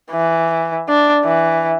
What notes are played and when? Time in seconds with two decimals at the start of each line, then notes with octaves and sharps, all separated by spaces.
0.11 E3
0.89 D4
1.24 E3